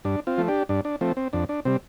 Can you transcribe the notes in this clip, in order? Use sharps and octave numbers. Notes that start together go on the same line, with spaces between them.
G2 D4
C4 F4
F3 A3
D4 G4
G2 D4
D4
F3 A3 C4
C4
F2 D4
D4
C3 G3 C4